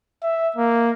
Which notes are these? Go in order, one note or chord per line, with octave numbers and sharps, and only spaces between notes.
E5
A#3